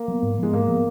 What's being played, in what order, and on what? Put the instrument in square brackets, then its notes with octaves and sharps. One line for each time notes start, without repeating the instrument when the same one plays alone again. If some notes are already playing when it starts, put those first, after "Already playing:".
Already playing: [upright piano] A#3
[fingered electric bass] F#3 B3
G#2
[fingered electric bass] F3 B3 [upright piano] G#3
[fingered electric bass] G#2 [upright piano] A#3
[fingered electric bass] F3 B3